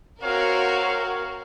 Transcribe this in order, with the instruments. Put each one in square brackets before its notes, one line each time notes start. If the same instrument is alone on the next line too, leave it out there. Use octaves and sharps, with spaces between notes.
[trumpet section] C4 C#5 F5 [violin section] F#4 A#4